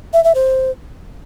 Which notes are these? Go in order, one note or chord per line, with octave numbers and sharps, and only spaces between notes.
E5
E5
C5